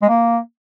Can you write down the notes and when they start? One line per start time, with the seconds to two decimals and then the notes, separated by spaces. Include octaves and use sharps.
0.02 G#3
0.08 A#3